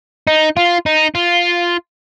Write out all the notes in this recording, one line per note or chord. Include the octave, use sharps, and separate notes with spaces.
D#4
F4
D#4
F4